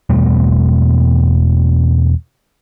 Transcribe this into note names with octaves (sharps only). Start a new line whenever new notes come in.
E2 B2 G3 A3